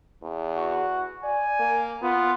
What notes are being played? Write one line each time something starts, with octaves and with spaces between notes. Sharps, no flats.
E2
F#4
D5 G#5
A#3
B3 F4